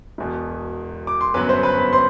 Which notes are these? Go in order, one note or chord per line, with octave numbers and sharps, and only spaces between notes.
E1 E2 B2
D6
C6
G1 F#2 F#3 B3 B4 B5
C5 C6
B4 B5
B4 B5
C5 C6